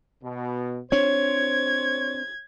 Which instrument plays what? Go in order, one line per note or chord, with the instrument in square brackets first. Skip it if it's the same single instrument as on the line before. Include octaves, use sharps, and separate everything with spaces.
[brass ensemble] B2
[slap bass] C4 D4 [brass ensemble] C5 [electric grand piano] C#5 [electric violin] G#6